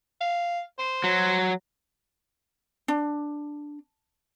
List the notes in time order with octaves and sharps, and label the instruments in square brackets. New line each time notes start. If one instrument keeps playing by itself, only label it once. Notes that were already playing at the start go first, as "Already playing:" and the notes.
[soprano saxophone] F5
C5
[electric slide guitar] F#3
[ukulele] D4